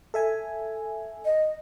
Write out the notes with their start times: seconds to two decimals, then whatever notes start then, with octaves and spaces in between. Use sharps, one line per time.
0.14 A4 E5 G#5
1.25 D#5